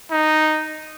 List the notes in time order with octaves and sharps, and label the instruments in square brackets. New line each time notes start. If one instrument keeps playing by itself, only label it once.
[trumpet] D#4